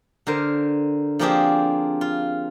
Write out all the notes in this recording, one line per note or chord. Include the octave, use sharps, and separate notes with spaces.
D3 A#4 C5
F3 A#3 C4 D4 G4 G#4
F4